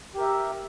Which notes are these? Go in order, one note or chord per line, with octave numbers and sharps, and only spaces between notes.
G4 A#4 E5